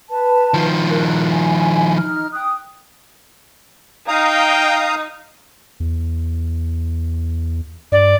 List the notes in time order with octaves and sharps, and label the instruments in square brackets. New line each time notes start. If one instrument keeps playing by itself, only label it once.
[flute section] B4 A5
[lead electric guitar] D#3 F3
[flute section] A#4 F#6
G#5
D#4 F6
G5 D#6 F#6
[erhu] D#4 [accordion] F5 A#5 D#6 [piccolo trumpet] G5
[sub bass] E2
[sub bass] G2 [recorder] D5